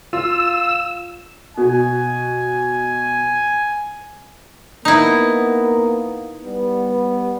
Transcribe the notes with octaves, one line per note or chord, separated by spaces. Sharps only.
F4 E6
B2 G#5
A#3 B3 D#4 E4
G3 B3